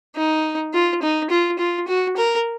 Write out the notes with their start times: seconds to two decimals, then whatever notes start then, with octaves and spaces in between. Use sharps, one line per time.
0.17 D#4
0.74 F4
1.03 D#4
1.30 F4
1.59 F4
1.88 F#4
2.17 A#4